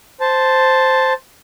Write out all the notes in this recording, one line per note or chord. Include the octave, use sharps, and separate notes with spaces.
C5 A5